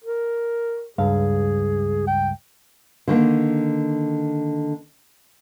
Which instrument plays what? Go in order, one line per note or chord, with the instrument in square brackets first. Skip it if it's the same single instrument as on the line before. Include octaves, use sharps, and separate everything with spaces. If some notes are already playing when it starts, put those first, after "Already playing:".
[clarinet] A#4
[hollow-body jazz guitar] C#2 G2 F5 [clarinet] G#4
[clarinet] G5
[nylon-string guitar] D3 D#3 A#3